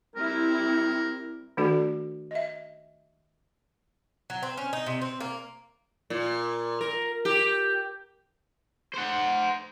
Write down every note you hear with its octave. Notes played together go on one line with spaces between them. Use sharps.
G3 C4 E4 A#4
D#3 A3 D4 F#4 A4 D5
D#5 E5
F#3
C4
C#4
D#4
C3
C4
A#3
A#2
A#4
G4
C5 F#5